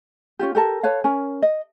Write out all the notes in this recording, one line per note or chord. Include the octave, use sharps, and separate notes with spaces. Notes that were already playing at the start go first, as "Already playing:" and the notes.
C#4 F4 G4
G4 A4 A#4 A5
A4 B4 C#5 F5
C#4 A#4 G#5
D#5